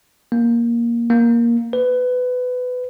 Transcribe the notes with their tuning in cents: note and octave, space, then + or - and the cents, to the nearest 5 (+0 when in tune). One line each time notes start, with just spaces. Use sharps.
A#3 +10
A#3 +10
B4 +20